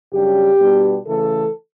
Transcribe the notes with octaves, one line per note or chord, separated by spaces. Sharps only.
F#2 C#3 G3 D4 G4
B2 G3 B3 D4
C#3 E3 A3 A4